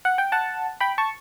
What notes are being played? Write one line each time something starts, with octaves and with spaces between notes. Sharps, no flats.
F#5
G5
F#5 A5
G5 B5
A5 C#6